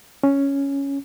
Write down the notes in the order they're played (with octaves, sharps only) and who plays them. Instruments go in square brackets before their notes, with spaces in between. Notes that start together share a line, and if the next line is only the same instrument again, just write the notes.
[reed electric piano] C#4